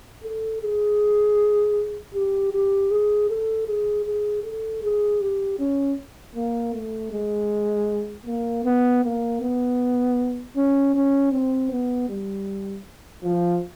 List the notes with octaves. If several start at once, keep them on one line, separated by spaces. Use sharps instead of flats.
A4
G#4
G4
G4
G#4
A4
G#4
G#4
A4
G#4
G4
C#4
A#3
A3
G#3
A#3
B3
A#3
B3
C#4
C#4
C4
B3
G3
F3